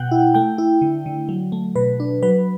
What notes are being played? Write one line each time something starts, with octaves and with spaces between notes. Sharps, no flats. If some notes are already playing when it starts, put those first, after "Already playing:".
Already playing: B2 F#5 G5
E4
A3 G5
E4
D3
D3
F#3
A3
B2 B4
D4
F#3 B4